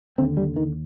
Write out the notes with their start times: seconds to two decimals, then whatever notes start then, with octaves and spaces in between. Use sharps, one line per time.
0.18 D#2 D3 C4
0.37 G3
0.56 D#3